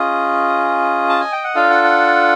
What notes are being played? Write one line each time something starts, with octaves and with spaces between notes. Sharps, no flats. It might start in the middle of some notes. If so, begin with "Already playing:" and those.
Already playing: C#4 F4 G#4 D#5
A5
G#5
G5
F#5
D4 F4 A4 F5
F#5
F#5